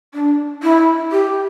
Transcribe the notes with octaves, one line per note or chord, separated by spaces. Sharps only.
D4
E4
G4